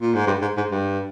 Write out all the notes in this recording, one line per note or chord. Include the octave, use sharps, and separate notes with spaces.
A#2
G#2
G2
G#2
G#2
G2